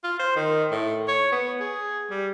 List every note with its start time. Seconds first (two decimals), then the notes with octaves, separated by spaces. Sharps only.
0.04 F4
0.19 C5
0.36 D#3
0.71 A2
1.08 C#5
1.32 B3
1.60 G#4
2.11 G3